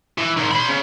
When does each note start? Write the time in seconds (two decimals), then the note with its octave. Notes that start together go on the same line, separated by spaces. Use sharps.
0.18 E3
0.37 G#2 D#3
0.52 C5 B5
0.69 C#3